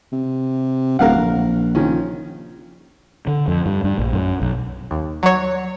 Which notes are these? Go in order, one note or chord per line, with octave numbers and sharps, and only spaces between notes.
C3
D1 A#4 F5 F#5
A#1
D#3 F3 C#4
D3
F2
G2
G2
A#1
F#2
B1
D#2
F#3 C#5